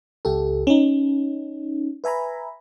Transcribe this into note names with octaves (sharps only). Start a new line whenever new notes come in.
C#2 G4 A4
C#4 D#4
B4 E5 G#5 A#5 B5